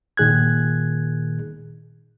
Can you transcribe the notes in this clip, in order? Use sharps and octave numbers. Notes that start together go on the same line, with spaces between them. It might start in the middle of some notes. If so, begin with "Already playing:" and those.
A#2 D#3 G#4 F#6 G#6